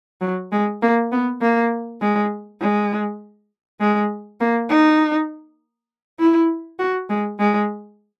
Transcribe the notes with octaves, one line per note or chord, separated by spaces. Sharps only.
F#3
G#3
A#3
B3
A#3
G#3
G#3
G#3
A#3
D#4
E4
F#4
G#3
G#3